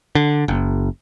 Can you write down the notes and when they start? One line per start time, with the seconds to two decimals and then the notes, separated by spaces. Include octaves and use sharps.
0.15 D3
0.48 F#1